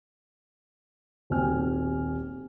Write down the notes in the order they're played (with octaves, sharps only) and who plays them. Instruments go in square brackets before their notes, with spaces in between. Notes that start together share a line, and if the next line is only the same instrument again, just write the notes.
[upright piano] D#1 B1 C4 G4 G#5 F6